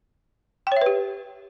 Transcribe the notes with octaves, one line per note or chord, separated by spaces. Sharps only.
G4 B4 C#5 E5 G5